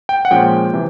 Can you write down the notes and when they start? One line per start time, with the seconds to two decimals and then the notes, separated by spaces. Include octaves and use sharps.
0.09 G5
0.25 F#5
0.31 A#2 F3 G#3 C#4 G5
0.73 C3 E3